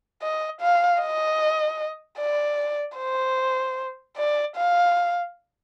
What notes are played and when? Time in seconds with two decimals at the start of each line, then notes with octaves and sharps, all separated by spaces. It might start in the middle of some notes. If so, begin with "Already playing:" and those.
0.22 D#5
0.61 F5
1.01 D#5
2.19 D5
2.98 C5
4.17 D5
4.57 F5